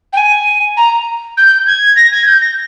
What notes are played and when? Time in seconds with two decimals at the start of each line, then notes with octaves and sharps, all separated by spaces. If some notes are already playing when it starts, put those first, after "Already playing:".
0.13 G5
0.17 G#5
0.77 A#5
1.37 G6
1.67 G#6
1.96 A#6
2.12 G#6
2.26 G6
2.41 A#6